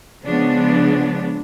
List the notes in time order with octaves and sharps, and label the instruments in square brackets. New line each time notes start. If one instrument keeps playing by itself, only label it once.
[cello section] C#3 F3 G#3 B3 D4